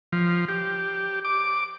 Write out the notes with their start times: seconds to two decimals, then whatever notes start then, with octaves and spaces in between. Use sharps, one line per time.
0.12 F3
0.48 G4
1.25 D6